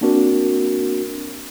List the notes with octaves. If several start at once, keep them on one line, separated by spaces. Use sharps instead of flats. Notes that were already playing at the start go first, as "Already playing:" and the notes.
A#3 C4 D4 F#4 A#4